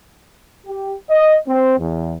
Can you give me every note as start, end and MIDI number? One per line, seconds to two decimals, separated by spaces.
0.66 0.94 67
1.10 1.36 75
1.48 1.75 60
1.79 2.15 40